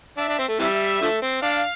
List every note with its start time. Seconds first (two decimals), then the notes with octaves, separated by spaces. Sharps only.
0.17 D4 E5
0.28 D4
0.38 C4
0.48 A3
0.59 C3 E3 G3 E5
1.01 D3 F3 A3
1.22 C4
1.42 D4 F5